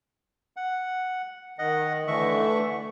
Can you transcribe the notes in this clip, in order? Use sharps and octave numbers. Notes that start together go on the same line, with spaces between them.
F#5
D#3 D#5 F#5
D3 E3 A3 E5 C#6